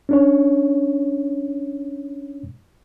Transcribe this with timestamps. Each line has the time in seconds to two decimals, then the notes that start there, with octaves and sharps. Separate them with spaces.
0.09 C#4 D4 C#5